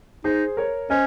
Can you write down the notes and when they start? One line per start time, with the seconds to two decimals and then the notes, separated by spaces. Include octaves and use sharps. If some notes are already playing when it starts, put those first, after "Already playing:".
0.24 D#4 G#4 C5
0.57 A#4 C#5
0.90 C#4 C5 D#5